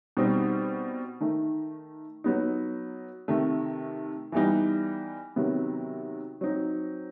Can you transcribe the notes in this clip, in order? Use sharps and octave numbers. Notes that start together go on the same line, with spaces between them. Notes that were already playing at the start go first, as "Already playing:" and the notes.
B2 G3 C4 D#4
D#3 A3 D#4
F#3 B3 D#4
C3 D#3 A3
E3 G3 B3 D#4
C3 D#3 F#3 B3
F#3 C4 D#4